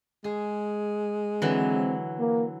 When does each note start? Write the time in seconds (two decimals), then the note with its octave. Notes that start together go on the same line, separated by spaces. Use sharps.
0.24 G#3 G#4
1.42 D3 E3 F#3 C4
2.18 A#3